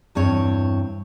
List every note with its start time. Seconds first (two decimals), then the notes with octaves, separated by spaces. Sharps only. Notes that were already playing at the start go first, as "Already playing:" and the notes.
0.15 E2 G2 C4 C#5